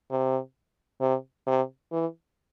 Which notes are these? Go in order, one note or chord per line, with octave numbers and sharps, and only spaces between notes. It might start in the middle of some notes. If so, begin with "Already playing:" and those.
C3
C3
C3
E3